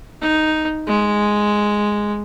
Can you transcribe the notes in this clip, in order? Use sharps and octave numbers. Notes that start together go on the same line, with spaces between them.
D#4
G#3